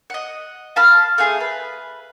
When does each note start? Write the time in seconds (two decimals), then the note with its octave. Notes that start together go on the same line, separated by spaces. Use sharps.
0.10 D#5 F#5
0.76 F5 A5 B5 F6
1.18 A3 F4 G#4
1.40 B4